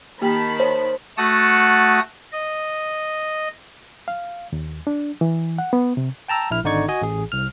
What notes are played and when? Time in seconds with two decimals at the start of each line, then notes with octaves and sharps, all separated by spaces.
0.21 D#3 A#3 G4 G5 A5 B5
0.60 C5 C#5
1.18 A3 F#4 F#5 A5 D#6
2.33 D#5
4.08 F5
4.53 D#2
4.87 D4
5.21 E3
5.58 F#5
5.73 B3
5.97 C3
6.28 G5 A5 A#5 E6
6.51 A#1 E4 F6
6.64 G#1 D3 D#4 D5 C#6 G#6
6.88 F#4 D#5 G#5
7.02 A1 G#4
7.32 C2 F6